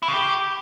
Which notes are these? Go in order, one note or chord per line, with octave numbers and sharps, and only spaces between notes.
E4
C#3
G4